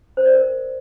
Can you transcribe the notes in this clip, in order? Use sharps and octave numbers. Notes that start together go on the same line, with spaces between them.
C5
D5
A#4